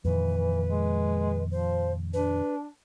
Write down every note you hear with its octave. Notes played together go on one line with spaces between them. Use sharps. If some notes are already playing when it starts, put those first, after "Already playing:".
F2 A#2 D#3 E3 B4
E3
G#3
F3 C5
D4 B4